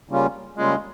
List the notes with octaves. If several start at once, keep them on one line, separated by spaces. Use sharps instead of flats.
C#3 G3 A#3 C#4 F4
C#3 G3 G#3 A#3 C#4 F4